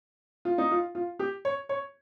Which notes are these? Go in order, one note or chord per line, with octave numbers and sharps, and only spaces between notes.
F4
D#4
F4
F4
G4
C#5
C#5